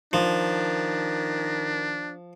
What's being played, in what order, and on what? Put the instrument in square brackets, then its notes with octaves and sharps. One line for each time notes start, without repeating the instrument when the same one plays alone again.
[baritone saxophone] D#3 [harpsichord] F3 [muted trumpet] D4